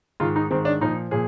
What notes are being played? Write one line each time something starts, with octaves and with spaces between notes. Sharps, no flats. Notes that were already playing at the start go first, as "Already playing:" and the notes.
G#2 D#3 F4
D#4
G#2 D#3 C4
D4
A#2 F3 D#4
A#2 F3 G#4